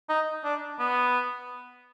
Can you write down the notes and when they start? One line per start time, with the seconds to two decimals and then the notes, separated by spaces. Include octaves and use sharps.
0.09 D#4
0.44 D4
0.79 B3